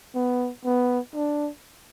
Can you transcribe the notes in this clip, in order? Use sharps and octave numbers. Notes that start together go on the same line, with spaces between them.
B3
B3
D4